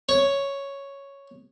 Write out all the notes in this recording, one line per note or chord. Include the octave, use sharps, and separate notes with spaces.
C#5